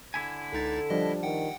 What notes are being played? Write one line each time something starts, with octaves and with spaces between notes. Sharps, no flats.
D3 E4 G#5
C#2 D#4 A4 A6
F3 G3 D4 D#5
D#3 F#5 G5